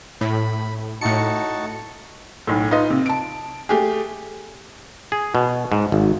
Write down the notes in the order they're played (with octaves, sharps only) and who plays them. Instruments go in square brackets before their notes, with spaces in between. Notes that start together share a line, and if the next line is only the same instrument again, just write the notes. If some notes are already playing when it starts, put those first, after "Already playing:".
[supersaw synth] A2 [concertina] B5
[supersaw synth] A2 C#7 [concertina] D#4 F#4 A5
[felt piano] B1 A2
D#4 F4 B4 D#5
C3
A5 D7
A3 G4 G#4
[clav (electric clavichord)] G#4
B2
G#2
G#1